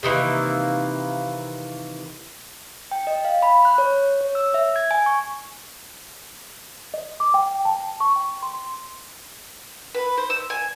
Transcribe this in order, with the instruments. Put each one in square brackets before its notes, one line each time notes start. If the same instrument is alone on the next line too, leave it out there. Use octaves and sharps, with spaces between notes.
[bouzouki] C3 D#3 E3 A#3
[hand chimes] G5
D#5
F5
B5
F#6
C#5
C#5
E6
E5
G#6
G#5
C#6
[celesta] D#5
D6
G5
A5
C#6
G5
C6
[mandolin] B4
C5
E6
G#5